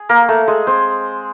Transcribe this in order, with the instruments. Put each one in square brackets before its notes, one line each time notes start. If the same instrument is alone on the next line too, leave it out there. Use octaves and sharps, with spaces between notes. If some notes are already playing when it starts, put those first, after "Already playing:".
Already playing: [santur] G#4
A#3 A#4
A3 A4
G#3 G#4
C4 C5